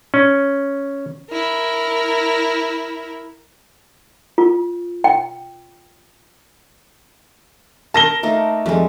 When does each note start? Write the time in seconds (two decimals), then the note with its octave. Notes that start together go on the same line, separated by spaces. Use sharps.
0.14 C#4
1.30 E4 A#4
4.38 F4
5.04 G5
7.94 A#4 A5 A#6 G7
8.23 A3 A#3 D#4
8.66 F2 G3 G#3